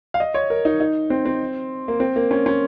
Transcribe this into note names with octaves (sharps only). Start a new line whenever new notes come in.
F5
D#5
C#5
A#4
D#4
D#4
C4
C4
A#3
C4
A#3
C#4
C#4